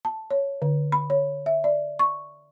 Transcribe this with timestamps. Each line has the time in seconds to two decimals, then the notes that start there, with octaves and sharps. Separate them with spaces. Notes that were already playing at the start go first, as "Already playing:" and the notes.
0.05 A5
0.31 C#5
0.62 D3
0.92 B5
1.10 C#5
1.46 E5
1.64 D5
1.99 C#6